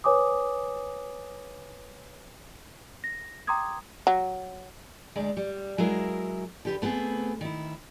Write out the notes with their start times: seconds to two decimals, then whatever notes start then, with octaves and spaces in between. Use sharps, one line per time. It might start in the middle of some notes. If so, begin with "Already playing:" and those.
0.04 B4 C#5 G#5 D6 D#6
3.04 A#6
3.47 G5 A#5 C6 D6 D#6 G#6
4.07 F#3
5.16 D2 G#3 D5
5.37 G3
5.78 F#3 G#3 E4 A#4
6.65 D3 G4 B4
6.82 A3 B3 C4 G#4
7.41 D#3 E4